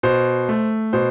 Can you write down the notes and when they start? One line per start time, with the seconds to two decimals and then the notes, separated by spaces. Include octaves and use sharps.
0.03 B2 C5
0.49 A3
0.93 B2 C5